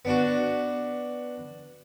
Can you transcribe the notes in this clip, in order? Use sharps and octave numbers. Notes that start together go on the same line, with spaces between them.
B3 D4 F#4